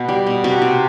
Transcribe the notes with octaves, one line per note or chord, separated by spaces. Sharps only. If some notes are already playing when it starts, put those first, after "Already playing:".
Already playing: B2
G3
B2
C3 F#4
C3